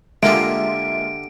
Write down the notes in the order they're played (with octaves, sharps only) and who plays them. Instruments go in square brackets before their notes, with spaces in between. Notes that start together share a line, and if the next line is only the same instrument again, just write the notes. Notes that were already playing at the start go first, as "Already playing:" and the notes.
[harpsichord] D3 G3 [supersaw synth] G#3 A#3 F4 [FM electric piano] E5 [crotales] D7